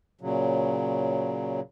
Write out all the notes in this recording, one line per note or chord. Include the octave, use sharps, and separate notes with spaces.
A#2 C#3 F#3